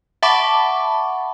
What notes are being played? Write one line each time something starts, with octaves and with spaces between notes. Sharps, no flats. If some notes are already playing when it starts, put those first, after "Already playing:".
E5 F#5 A5 B5 C#6 D6